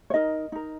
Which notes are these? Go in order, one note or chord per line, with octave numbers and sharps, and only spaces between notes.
C#5
D#4 A#4 D#5
D#4 A#4